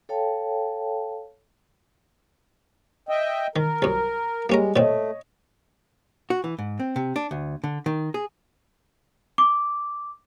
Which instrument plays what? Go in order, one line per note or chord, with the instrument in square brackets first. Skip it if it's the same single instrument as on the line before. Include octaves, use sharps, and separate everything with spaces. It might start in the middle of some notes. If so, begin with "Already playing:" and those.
[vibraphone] A4 C#5 F5 G5 A5
[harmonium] D#5 E5 G5
[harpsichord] D#3 [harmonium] A#4
[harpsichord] C2 F#2
[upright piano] G3 [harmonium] G#3 [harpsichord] A#3 C#4 A#4
[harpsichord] A#2 C4 [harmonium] A3 [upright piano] C#5 D#5
[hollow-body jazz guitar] F#4
E3
G#2
C4
C3
D4
D2
D3
D#3
G#4
[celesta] D6